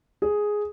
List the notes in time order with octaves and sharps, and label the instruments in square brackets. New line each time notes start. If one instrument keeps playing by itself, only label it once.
[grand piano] G#4